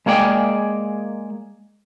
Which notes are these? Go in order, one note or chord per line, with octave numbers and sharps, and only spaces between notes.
G#3 A#3 G#4 D5 G5